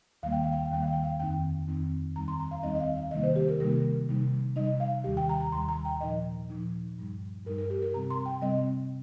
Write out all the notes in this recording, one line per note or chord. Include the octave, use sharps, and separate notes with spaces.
D#2 D#3 G3 A#3 F5
G5
F5
G5
F5
D#2 D#3 G3 A#3 G5
F5
G5
F5
F2 D#3 C4 D#4 G5
F2 D#3 C4 D#4
D#2 D#3 G3 C4 D#4 A#5
C6
A#5
F5
D#2 D#3 G3 C4 D#4 D#5
D#5
F5
F5
C3 D#3 G3 A#3 D#4 D#5
C5
G4
A#4
C3 D#3 G3 A#3 D#4 A#4
C3 G3 D#4
C3 G3 D#4 D#5
F5
D#2 D#3 G3 G4
G5
A#5
A#5
D#2 D#3 G3 C6
A#5
G5
A#2 F3 D#4 D#5
A#2 F3 D#4
G2 G3 D#4
G2 G3 D#4 A#4
A#4
G4
A#4
C3 G3 C4 A#5
C6
G5
C3 G3 C4 D#5